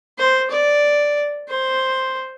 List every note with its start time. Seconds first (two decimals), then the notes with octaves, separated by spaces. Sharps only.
0.18 C5
0.50 D5
1.49 C5